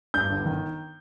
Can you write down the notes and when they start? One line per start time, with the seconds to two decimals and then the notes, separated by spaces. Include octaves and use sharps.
0.14 G2 G6
0.30 G1
0.45 D#3